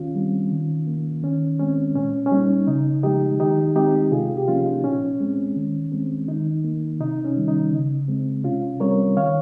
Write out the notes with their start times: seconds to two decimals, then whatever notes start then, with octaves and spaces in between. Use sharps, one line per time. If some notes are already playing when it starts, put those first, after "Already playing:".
Already playing: D#3 C#4 F4
0.15 G3 C4
0.51 D#3
0.87 A#3
1.23 D#3 C#4
1.59 G#3 C4 C#4
1.95 A#2 C#4
2.26 C#4
2.31 G3 A#3 D#4
2.67 C#3 D#4
3.03 F3 G#3 D#4 G4
3.40 D#3 D#4 G4
3.76 G#3 C4 D#4 G4
4.11 C3 F4 G#4
4.37 G4
4.48 F3 A#3 C#4 F4
4.66 D#4
4.84 A#2 C#4
5.20 G#3 C4
5.56 D#3
5.92 G#3 C4
6.28 D#3 D#4
6.64 A#3
7.00 C3 D#4
7.24 C#4
7.37 D#3 G3
7.48 D#4
7.72 C#3
8.08 G#3 C4
8.44 C3 C#4 F4
8.80 G3 C4 A#4 C#5
9.17 D#3 C#5 F5